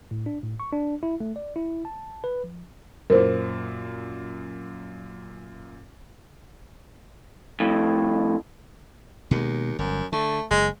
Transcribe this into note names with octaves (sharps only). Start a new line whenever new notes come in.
A2
D4
A2
C#6
D4
E4
A3
D5
E4
A5
B4
F3
F#2 A#2 A#4 C5
F2 A2
D#2 B2 G#3
G1 F#2
D3 A3
F#1 G#3